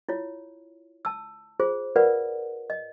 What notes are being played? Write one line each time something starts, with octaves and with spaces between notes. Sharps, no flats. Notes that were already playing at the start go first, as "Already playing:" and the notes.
E4 F4 C#5
A5 E6
F4 G#4 C5
F4 A#4 B4 D5 F5 F#5
D#5